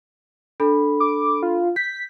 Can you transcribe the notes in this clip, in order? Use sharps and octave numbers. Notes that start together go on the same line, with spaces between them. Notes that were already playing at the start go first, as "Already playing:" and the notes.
D4 A4 B5
D6
F4
G6 B6